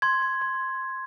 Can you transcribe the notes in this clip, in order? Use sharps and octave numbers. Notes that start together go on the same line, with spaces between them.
C6 G#6
C6
C6